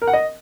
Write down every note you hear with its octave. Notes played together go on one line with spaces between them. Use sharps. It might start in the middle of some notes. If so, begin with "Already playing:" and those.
A#4
F#5
D#5